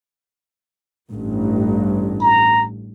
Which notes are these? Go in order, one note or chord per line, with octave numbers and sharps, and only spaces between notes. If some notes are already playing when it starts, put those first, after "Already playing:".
A1 G2
A#5